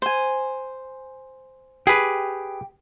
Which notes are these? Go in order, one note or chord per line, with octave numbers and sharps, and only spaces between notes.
C5 G#5
G4 G#4 B4